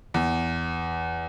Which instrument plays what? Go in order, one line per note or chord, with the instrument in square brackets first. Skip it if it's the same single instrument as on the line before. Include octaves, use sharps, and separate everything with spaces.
[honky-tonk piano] E2